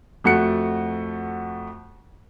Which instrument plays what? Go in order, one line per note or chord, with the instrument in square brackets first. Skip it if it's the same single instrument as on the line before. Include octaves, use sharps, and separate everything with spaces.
[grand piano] F2 A3 F#4 F#6 C#7